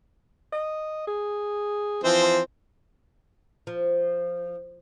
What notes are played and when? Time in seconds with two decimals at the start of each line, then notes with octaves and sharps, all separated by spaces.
0.53 D#5
1.07 G#4
2.04 E3 F3 C4 C5
3.67 F3